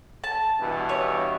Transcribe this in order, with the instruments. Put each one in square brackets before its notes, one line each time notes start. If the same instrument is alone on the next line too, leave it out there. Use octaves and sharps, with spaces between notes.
[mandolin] A5
[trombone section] G2 B2 E3
[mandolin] C#5